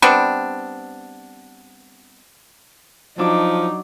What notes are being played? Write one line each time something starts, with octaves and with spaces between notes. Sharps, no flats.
G3 B3 C4 D4
F3 F#3 D4 D#4 D6